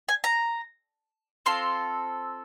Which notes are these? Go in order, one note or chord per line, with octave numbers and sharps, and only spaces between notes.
G#5
A#5
C4 F4 A4 C6